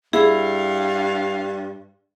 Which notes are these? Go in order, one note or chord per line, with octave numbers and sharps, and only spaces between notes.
G2 E4 G#4 F5